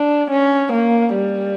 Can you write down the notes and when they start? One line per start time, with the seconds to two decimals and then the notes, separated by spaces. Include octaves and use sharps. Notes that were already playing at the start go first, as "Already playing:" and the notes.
Already playing: D4
0.31 C#4
0.72 A#3
1.14 G3